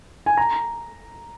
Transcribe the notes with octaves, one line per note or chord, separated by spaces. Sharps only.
G#5
A#5